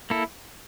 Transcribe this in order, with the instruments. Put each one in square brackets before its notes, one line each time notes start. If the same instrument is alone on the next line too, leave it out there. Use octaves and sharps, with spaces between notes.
[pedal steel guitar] A#3 E4 A4